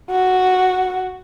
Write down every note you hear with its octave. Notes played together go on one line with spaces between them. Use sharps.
F#4